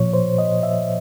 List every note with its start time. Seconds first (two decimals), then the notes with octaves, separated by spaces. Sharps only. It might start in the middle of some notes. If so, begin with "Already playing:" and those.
Already playing: A#2 F3 C#5
0.13 C5
0.38 D#5
0.63 E5